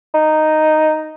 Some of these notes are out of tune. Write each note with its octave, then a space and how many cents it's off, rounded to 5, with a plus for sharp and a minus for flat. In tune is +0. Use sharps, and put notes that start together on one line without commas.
D#4 -5